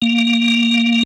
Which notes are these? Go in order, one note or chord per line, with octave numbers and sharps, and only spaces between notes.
A#3